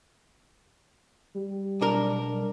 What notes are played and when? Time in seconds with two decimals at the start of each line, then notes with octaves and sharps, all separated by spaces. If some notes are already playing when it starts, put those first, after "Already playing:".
1.34 G3
1.81 B1 D4 A#4